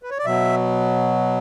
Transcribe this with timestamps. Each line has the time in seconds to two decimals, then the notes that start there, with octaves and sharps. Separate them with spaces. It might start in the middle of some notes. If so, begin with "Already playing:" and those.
0.03 B4
0.11 C#5
0.18 D5
0.25 B2 F#3 E5